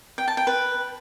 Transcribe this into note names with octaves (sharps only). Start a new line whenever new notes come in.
G5
A5
G5
B4